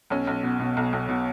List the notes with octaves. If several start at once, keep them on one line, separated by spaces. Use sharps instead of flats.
B1 C#4
B1
B2
B2
B1
B1
B2